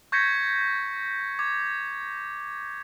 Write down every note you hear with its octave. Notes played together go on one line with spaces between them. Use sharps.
C#6 G6 G#6 A#6 B6 C#7
D6 G#6